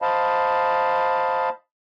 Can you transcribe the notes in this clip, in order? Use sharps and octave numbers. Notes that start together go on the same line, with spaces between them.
C5 D#5 F5 A5 B5